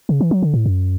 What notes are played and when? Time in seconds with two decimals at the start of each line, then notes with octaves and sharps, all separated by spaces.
0.09 C#3
0.21 E3
0.31 F#3
0.43 D3
0.54 A2
0.66 F#2